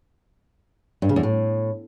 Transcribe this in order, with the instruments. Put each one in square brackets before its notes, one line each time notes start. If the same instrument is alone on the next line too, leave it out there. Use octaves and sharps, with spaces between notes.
[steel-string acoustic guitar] G2
C#3
E2
A2